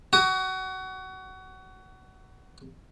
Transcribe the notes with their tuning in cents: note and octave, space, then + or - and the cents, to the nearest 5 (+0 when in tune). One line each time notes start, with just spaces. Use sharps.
F#4 +25 D#6 +0